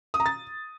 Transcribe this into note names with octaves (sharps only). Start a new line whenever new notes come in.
D#6
A#5
A6